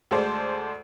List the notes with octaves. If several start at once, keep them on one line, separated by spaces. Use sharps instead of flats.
D2 G#3 A4 C5 D5